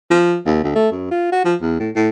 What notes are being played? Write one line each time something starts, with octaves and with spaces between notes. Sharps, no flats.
F3
D#2
D2
A3
F#2
F4
F#4
F3
E2
A2
A2